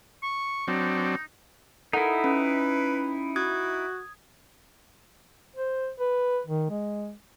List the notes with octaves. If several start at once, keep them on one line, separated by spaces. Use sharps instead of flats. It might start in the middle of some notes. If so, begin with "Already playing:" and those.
C#6
F#3 C4 D4 D#4
D#4 E4 A4 A#4 F#5
C#4 B4
F#4 D#6 G#6
C5
B4
D#3
G#3